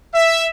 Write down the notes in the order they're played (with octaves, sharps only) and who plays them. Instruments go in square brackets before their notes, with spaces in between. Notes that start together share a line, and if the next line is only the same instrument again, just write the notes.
[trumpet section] E5